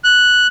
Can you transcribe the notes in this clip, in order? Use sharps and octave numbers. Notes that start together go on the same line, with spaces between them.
F#6